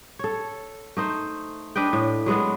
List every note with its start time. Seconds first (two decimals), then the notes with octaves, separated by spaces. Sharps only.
0.19 A4 C#5
0.97 A3 D#4 C5
1.76 D4 B4 D#5 G5
1.93 A2
2.26 F#3 G#3 B3 F#4